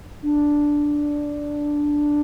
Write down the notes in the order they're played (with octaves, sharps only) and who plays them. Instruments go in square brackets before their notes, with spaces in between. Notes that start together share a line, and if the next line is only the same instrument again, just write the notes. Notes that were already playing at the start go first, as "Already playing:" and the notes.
[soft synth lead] D4